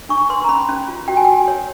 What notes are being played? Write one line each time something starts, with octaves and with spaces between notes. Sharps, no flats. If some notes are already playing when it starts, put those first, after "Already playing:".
D4 C#6
B4 C6
A#5
C#4 B5
C#4
F4
F#4 G5
G#5
F#4 G5
C#5